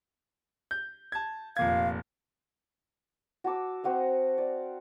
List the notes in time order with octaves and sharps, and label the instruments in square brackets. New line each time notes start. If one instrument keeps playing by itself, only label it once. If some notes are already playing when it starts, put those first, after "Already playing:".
[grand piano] G6
A5 G#6
[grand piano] F1 A#2 G#6 [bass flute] F5
[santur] F#4 A5 D6 E6
C4 F#4 D#5 F5
D5